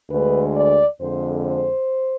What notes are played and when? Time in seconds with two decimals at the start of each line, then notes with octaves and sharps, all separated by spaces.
0.10 D2 D3 G#3 B4
0.56 D5
1.00 F2 D3 G#3 C5
1.46 C5